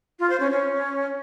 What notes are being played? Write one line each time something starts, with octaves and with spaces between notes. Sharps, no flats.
F4
C5
C#4
C#4